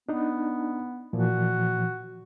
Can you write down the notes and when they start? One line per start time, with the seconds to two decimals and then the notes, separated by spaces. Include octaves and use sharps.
0.09 B3 D4 D#4
1.13 A#2 E3 F3 F#4